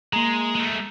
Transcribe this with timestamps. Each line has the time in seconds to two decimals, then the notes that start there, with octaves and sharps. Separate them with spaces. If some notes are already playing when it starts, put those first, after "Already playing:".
0.13 G#3 A#3 A#5
0.55 G#3 A3